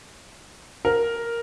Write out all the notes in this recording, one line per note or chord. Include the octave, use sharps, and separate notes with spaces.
A#4